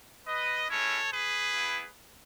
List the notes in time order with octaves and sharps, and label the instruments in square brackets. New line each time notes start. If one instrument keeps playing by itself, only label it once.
[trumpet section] B4 D#5
G#3 C#4 E4 A4 C#5
G#4 B4
B3 E4